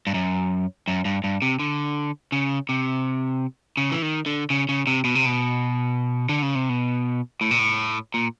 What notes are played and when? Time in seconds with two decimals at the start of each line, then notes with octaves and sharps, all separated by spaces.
0.07 G2
0.14 F#2
0.88 F#2
1.05 G2
1.24 G2
1.42 C3
1.59 D3
2.32 C#3
2.69 C3
3.77 C#3
3.92 E3
4.02 D#3
4.26 D3
4.50 C#3
4.69 C#3
4.87 C3
5.04 B2
5.15 C3
5.26 B2
6.29 D3
6.42 C#3
6.55 C3
6.69 B2
7.41 A2
7.51 A#2
7.59 A2
8.14 A#2